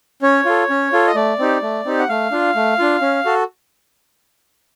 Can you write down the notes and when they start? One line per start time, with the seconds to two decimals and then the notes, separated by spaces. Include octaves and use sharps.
0.22 C#4 C#5
0.45 F4 A4
0.70 C#4
0.93 F4 A4
1.07 D#5
1.15 A3 D5
1.39 C4 D#4 G4
1.62 A3
1.85 C4 D#4 G4
1.99 F#5
2.09 A3 F5
2.31 D4 F4
2.55 A3
2.79 D4 F4
3.01 C#4
3.25 F#4 A4